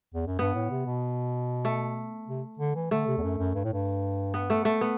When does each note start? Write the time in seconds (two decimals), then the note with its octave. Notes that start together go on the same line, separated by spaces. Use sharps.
0.14 E2
0.27 F#2
0.39 G2 B3
0.55 A2
0.70 C3
0.86 B2
1.65 A3
2.28 C3
2.59 D3
2.75 E3
2.91 D3 A3
3.07 C3
3.18 E2
3.23 F#2
3.38 F#2
3.55 G2
3.64 A2
3.73 G2
4.34 B3
4.50 A3
4.65 A3
4.81 B3